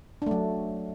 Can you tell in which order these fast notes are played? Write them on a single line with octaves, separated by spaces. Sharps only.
D4 A3 F#3